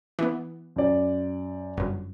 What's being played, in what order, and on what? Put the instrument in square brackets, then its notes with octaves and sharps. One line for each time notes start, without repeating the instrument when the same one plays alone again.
[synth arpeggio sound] E3 B3
[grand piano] F#2 D5
[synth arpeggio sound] G1 F#2